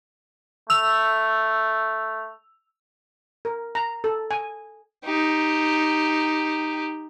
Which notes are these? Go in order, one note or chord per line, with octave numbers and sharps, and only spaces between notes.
A3 E6 F7
A#4
A#5
A4
G#5
D#4 G4